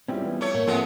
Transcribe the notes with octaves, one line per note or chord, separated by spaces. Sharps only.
G3 G#3 C4 C#4 E4 F4
E3 B3
A3 C#5
A2 A#3
F3 G#3 B3 C4 A4 E5 F#5